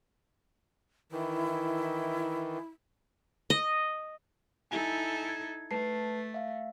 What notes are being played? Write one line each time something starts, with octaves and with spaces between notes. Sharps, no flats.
D#3 E3 E4
D#5
D#4 E4 A4 G#5
G#6
A3 B4 A5 C7
E5 F5